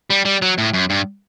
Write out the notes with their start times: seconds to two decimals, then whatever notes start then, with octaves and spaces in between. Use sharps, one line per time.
0.10 G3
0.25 G3
0.42 F#3
0.58 A2
0.73 F#2
0.90 G2